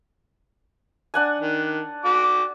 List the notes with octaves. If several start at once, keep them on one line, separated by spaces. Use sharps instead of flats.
D4 F#5 G#5
D#3
F#4 D6